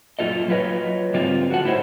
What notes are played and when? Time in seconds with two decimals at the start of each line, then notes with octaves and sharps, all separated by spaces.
0.19 F#2 A#2 F4 A4 D#5
0.48 F#3 F4 B4 C#5 D#5
1.13 G#2 D3 G3 C4 F4
1.50 F#4 A4 A#4 F#5
1.65 A2 E4 A4 C5 C#5 D#5